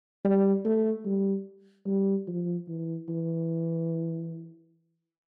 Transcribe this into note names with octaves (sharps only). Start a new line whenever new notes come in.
G3
A3
G3
G3
F3
E3
E3